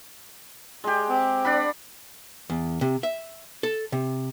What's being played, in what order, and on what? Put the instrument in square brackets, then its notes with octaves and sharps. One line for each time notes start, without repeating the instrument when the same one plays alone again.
[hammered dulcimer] G#3 G4
[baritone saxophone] C4
[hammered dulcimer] D4 F#5 B5
[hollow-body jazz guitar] E2
C3
E5
A4
C3